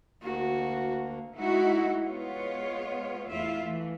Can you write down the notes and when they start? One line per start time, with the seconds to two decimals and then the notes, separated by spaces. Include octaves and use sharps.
0.22 D2 A#3 F#4
1.37 G#3 A3 D#4 E4 F#4
2.05 G#3 B3 F4 C#5
3.29 E2 A3 E4 F4 E5 F5
3.65 E3 A3